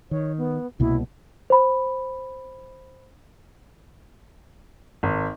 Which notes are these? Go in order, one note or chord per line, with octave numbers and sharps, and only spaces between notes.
D#3 C#5
B3
C2 B2 A#3 E4
C5 B5
G#1